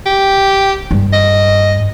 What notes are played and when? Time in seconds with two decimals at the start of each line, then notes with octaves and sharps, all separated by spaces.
0.06 G4
0.91 G2
1.13 D#5